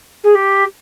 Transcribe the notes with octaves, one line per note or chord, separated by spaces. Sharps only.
G#4
G4